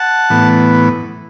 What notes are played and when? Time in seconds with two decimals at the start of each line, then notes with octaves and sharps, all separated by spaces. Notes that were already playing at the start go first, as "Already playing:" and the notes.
Already playing: F#5 A5
0.30 A2 E3 B3